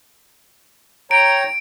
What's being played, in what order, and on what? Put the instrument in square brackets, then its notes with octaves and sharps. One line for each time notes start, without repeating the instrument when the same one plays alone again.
[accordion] C#5 G5 A#5 [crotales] D7